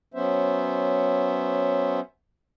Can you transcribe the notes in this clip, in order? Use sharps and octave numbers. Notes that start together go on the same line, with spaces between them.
F#3 B3 C#4 C5 E5